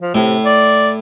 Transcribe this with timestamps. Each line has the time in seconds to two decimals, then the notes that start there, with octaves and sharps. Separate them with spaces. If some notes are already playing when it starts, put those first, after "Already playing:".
0.01 F3
0.15 A2 C3
0.45 D5